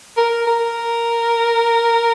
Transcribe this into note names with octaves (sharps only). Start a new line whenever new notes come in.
A#4
A#4